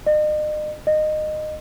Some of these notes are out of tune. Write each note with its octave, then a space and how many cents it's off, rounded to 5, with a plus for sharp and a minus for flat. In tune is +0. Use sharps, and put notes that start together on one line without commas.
D#5 -40
D#5 -20